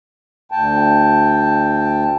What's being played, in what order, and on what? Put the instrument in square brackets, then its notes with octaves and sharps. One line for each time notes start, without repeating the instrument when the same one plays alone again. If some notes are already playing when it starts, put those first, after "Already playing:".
[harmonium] D2 G5 A5